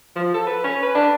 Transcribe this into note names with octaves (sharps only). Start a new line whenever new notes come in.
F3
A4
B4
C#4
B4
D4